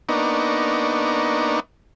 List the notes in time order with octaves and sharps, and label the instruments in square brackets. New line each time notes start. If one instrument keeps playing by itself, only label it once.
[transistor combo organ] A#3 B3 D4 D#4 C#6